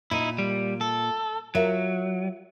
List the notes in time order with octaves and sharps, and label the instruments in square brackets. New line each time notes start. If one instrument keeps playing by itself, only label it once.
[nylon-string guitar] A#2 [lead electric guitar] D#4 E4
[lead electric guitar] G3
A4
[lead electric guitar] F#3 [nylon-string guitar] F4 A#4 E5